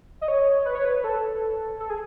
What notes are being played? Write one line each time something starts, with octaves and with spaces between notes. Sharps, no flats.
D#5
C#5
B4
C#5
B4
A4
A4
G#4